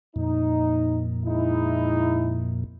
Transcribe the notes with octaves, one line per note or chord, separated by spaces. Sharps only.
F2 A#2 D#4
G#3 D#4 E4